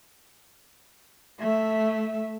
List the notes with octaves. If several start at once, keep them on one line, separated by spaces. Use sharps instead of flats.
A3 E5